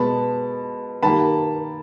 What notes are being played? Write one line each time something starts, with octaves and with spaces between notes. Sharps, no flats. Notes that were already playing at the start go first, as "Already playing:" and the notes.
Already playing: B2 G#3 B3 A5 B5
D#3 G3 A#3 A5 B5